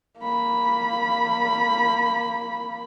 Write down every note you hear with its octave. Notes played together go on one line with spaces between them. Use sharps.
A#3 B5